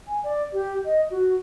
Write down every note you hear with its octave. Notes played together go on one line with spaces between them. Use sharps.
G#5
D5
G4
D#5
F#4